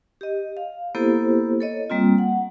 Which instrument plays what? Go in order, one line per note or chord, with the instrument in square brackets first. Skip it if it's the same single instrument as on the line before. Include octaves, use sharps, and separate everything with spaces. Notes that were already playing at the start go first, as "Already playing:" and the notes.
[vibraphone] G4 D#5
F5
A#3 B3 E4 G4 A4 C5
A4 C#5 D#5
G3 A#3 C4 F4
F#5